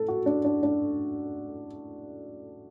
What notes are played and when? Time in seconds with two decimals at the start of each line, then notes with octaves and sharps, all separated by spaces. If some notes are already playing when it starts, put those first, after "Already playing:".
Already playing: A2 A4
0.08 F#4
0.26 D4
0.44 D4
0.63 D4